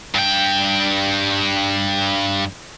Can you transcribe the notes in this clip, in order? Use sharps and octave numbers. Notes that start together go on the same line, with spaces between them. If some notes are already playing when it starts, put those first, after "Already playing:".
G2 G5